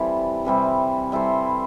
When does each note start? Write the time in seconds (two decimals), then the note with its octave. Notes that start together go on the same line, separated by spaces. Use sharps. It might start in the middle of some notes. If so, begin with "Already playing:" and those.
Already playing: E3 G3 C4 E4 A4
0.45 C3 E3 G3 C4
1.12 G3 E4 A4 C5